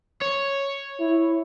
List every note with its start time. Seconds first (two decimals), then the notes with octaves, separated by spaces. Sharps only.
0.21 C#5
1.00 E4